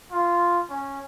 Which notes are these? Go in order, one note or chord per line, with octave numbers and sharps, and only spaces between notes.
F4
C#4